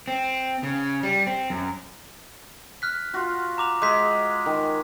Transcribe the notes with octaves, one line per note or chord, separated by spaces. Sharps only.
C4
C#3
G3
C4
F#2
F6 F#6 B6
F4 F#4
A#5 D6 F7
G#3 D6 G6 B6
D#3